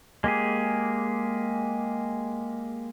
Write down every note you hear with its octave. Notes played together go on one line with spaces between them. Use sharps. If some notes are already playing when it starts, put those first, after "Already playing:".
G#3 A#3 G4 G#4